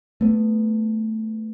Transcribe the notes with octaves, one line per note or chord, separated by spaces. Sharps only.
A3 B3